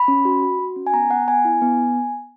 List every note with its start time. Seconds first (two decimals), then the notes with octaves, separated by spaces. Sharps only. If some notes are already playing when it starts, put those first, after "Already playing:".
Already playing: B5
0.08 C#4
0.25 F#4
0.43 F#4
0.59 F#4
0.76 C#4
0.87 G#5
0.94 B3 A#5
1.11 B3 F#5
1.28 B3 G#5
1.45 E4
1.62 B3